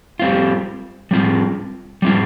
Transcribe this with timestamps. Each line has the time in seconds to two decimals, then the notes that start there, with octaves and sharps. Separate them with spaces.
0.19 G3 C4 F4
1.11 G3 C4 F4
2.02 G3 C4 F4